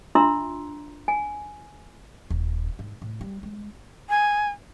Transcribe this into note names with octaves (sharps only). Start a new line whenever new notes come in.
D4 F4 E5 A#5 C6 E6
G#5
D#1
G#2
A2
G3
G#3
G#5